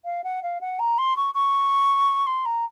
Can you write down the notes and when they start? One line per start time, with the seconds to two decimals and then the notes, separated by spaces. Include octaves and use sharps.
0.04 F5
0.23 F#5
0.42 F5
0.60 F#5
0.79 A#5
0.98 C6
1.16 C#6
1.34 C#6
2.26 C6
2.45 A#5